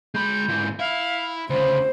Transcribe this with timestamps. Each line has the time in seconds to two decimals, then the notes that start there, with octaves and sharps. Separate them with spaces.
0.15 G#3 B5 G6
0.48 G#2 E3
0.79 E4 F5
1.50 D2 C#3 C5 B5